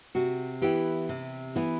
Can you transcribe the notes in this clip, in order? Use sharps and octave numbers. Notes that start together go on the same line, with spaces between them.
C3 F#4
E3 B3 E4 G4
C3
E3 B3 E4